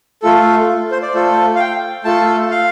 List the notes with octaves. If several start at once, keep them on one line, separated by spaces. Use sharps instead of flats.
A3 F4 A4
C5
D5
A3 F4 A4 C5
F5
G5
A3 F4 A4 A5
F5